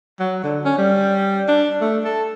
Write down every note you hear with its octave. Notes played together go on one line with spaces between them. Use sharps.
F#3
D3
C#4
G3
D4
A3
A4